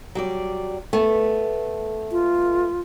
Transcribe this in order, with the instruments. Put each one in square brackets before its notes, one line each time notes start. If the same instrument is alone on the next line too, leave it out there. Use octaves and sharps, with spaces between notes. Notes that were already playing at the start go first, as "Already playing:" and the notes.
[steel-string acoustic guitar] F#3 G3 D5
A3 B3 B4
[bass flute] F4